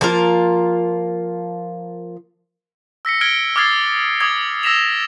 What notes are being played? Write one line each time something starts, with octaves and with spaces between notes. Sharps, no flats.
F3 A#3 F4 A#4
E6 A#6 B6 C#7
F6 G#6 D7 G7
D6 D#6 F6 G#6 A6 C7
D6 D#6 G#6
E6 A#6 B6 E7 F7